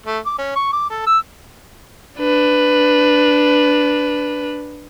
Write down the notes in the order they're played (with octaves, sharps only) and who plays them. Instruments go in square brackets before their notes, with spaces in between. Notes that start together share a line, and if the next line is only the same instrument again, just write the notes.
[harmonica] A3
D6
C#4
C#6
D6
A4
E6
[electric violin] D4 B4